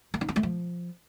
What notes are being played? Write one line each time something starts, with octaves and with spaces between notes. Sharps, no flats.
A#3
D#4
A#3
A3
F3